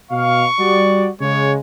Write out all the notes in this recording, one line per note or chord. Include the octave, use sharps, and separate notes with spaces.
B2 F5 C#6
G3 F#4 D5
C#3 G#3 C#5